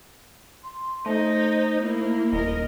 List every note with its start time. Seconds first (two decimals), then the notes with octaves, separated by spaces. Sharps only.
0.64 C6
1.06 A3 D#4 C5
1.82 A#3 E4
2.32 D#1 A#4 D#5